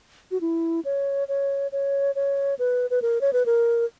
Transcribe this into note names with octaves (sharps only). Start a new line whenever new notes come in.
F#4
E4
C#5
C#5
C#5
C#5
B4
B4
A#4
C#5
B4
A#4